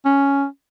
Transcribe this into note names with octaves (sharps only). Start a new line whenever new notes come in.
C#4